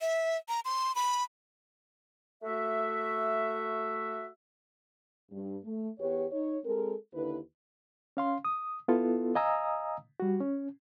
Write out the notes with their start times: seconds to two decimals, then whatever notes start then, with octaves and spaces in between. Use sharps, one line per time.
0.01 E5
0.49 A#5
0.65 C6
0.95 B5
2.43 A3 F#4 E5
5.31 G2
5.65 A3
6.00 E2 B3 G4 B4 C#5
6.32 D#4 C#5
6.64 G#3 C4 A4 A#4
7.13 D#2 D3 E4 B4
8.17 C#4 F5 C6
8.45 D#6
8.88 B3 E4 F4 A4
9.35 D#5 F5 G#5 A#5 D#6 E6
10.20 G3 F#4
10.41 C#4